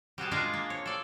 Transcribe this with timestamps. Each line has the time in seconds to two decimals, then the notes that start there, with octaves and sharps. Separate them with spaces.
0.18 G3 F#4 G#4 A5
0.31 G#3 D4 F4 G#4 A#4 F5
0.54 A#3
0.70 C#5
0.86 A4 D5